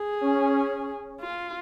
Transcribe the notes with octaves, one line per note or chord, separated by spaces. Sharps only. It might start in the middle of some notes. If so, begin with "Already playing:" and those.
Already playing: G#4
C#4
F4